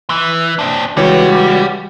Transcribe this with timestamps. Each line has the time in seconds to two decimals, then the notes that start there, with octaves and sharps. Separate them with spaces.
0.10 E3
0.59 C4 D4
0.97 C#2 E3 G3 F#4 C#5